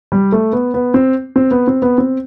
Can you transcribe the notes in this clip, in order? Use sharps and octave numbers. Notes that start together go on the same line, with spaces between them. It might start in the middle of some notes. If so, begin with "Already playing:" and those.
G3
A3
B3
B3
C4
C4
B3
C4
B3
C4